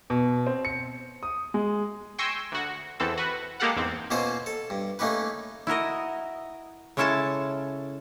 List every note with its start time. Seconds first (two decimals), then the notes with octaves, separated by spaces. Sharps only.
0.10 B2
0.47 C4
0.65 C#7
1.23 D#6
1.54 G#3
2.18 G5 G#5 C6 C#6 E6 A#6
2.52 D2 F#4
3.00 E2 E3 C4 A4
3.17 F#4 B4
3.60 G#3 A#3 G4 A4 F5 F#5
3.76 E2 G#2 C4
4.11 B2 A#3 C#4 F4 C5 D#6
4.46 A4
4.70 G2
4.99 A3 A#3 C#4 D#4 G4 B4
5.67 E4 F#4 A#4 D#5
6.97 C#3 G#3 C#4 E4 A4 A5